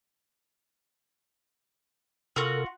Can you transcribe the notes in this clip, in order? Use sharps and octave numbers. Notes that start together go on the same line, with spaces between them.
C3 F4 F#4 A4 A#4